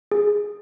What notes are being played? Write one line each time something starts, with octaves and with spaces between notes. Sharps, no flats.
G#4